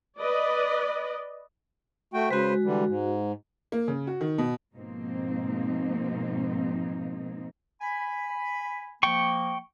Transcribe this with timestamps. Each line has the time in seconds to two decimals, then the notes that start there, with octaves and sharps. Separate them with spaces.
0.20 B4 D5 D#5
2.14 A3 F#4 G5
2.31 C#3 G#3 F#4 B4 C5
2.64 D3 E3 G3
2.87 G#2
3.72 A#3
3.88 C#3
4.07 F#4
4.21 D#3
4.38 B2
4.74 G#2 B2 F3 A#3 C4 D#4
7.81 G#5 B5
9.03 F3 A#3 G5 C#6